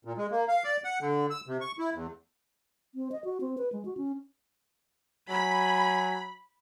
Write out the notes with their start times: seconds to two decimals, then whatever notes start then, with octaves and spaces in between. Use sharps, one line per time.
0.05 A#2
0.18 G#3
0.32 A#3
0.48 F5
0.64 D5
0.84 F#5
1.01 D3
1.31 E6
1.47 C3
1.61 C#6
1.79 E4
1.94 E2
2.95 C4
3.12 D#5
3.24 F#4
3.41 C4
3.58 B4
3.73 G#3
3.85 F#4
3.97 C#4
5.30 F#3 G#5 B5